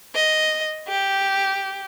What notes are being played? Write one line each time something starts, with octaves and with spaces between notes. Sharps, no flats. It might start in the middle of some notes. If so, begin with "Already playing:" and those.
D#5
G4